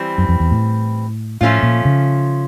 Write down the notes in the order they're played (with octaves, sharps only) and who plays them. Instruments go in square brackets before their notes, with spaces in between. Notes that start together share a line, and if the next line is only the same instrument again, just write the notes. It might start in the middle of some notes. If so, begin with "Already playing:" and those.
Already playing: [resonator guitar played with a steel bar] E3 G3 C4
[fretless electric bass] F#2
F2
E2
A2
[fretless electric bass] A2 [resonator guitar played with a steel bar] F3 A3 C#4 F4
[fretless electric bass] A#2
C#3